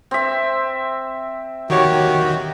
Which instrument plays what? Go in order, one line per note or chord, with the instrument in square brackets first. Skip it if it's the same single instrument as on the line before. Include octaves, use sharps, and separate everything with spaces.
[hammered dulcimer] C4 E5
[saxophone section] D#2 G4 C#5 [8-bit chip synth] D#3 [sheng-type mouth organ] F#4